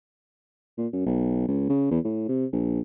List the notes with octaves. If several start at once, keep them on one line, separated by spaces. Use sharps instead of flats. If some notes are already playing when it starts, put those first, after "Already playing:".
A#2
F#2
B1
C#2
C#3
E2
A2
C3
A#1